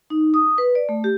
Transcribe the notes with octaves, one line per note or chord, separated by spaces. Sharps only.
D#4
D#6
B4
D5
A3
G4